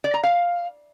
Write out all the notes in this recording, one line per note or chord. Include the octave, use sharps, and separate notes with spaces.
D5
A#5
F5